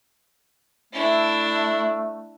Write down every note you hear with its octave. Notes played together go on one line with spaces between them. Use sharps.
A3 D4 E4